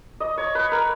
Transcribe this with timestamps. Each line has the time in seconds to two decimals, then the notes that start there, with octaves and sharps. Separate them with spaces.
0.20 D#5
0.38 C#5
0.55 B4
0.72 A#4